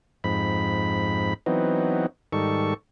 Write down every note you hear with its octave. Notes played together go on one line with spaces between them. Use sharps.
F2 G#2 B5
E3 F#3 B3 C4 D#4
G#2 D#3 G3 A4 C#6